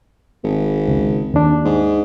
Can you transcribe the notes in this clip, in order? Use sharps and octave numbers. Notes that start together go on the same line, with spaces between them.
G#1
C#2
D#2 D4
G#2